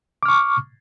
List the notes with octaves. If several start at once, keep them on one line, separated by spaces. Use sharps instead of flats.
C#6 D6 F6